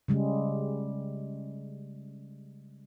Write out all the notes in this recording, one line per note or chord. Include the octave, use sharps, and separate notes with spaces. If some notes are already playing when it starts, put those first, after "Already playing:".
C#3 G3 G#3